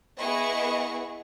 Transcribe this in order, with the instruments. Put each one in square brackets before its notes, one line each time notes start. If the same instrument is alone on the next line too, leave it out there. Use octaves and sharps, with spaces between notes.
[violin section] B3 E4 G#4 B4 D#5 C#6